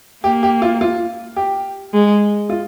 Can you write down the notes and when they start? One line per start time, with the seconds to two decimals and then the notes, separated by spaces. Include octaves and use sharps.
0.24 A#3 G4
0.43 G4
0.62 F4
0.81 F4
1.36 G4
1.93 G#3
2.50 F4